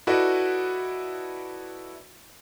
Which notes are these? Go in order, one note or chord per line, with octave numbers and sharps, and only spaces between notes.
E4 F#4 A4 B4 D5 D#5